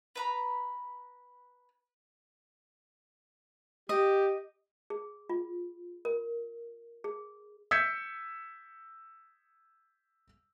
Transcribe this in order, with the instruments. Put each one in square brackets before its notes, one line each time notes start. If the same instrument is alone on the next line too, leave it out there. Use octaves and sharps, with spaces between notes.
[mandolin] B4 A#5 B5
[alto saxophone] G4 [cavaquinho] D#5
[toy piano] G#4
F4
A#4
G#4
[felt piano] E6 G6 G#6 B6 C#7